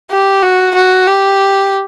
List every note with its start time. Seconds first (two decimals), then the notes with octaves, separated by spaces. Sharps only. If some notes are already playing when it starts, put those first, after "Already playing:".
0.11 G4
0.43 F#4
0.75 F#4
1.07 G4